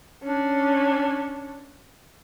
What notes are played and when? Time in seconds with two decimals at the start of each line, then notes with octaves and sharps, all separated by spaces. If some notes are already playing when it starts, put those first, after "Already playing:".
0.23 C#4 D4